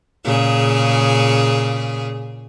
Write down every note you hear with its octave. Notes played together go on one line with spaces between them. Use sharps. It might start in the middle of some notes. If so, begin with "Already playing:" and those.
A#2 C#3 G#4